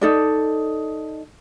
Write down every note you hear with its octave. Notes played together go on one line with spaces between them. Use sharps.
D#4 A4 D5